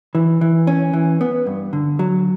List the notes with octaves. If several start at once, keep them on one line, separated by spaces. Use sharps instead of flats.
E3
E3
C#4
E3
B3
G2
D3
F#3